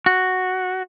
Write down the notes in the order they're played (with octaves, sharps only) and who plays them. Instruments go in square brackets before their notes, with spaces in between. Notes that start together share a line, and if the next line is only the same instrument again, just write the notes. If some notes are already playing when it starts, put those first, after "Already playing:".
[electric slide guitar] F#4